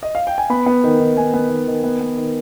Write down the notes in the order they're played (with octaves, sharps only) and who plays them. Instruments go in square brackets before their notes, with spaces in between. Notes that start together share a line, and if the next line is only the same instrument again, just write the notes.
[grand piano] D#5
F5
G5
G#5
B3 B5
B3
D#3
D#3
B3 G#5
B3
D#3
D#3
B3
B3
D#3